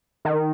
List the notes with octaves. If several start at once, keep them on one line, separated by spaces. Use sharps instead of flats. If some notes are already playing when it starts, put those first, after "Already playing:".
D#3